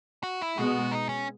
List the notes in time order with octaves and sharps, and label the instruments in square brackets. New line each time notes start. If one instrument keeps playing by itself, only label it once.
[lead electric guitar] F#4
E4
[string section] B2 G#3 B3 [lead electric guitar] F#4
[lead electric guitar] D#4
C#4